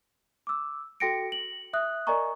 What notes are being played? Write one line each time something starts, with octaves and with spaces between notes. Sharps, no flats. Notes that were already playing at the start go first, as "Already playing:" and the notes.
D6 E6
F#4 A4 G5 A#6 C#7 D7
F#7
E5 D#6 F#6
A#4 D5 D#5 G#5 A#5 C#6